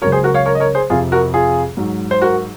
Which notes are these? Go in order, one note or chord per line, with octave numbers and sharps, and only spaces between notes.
C#2 C#3 F#3 A#4 C#5
G#4 C5
F#4 A#4
C#5 F5
A#4 C#5
D#5
A#4 C#5
G#4 C5
F2 C3 F3 F4 G#4
F#4 A#4
F4 G#4
G#2 F#3
C5
F#4 A#4